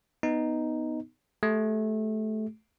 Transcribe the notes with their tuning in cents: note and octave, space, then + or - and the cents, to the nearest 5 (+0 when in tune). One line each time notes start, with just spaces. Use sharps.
B3 +5 D#4 +0
A3 -20 G4 +0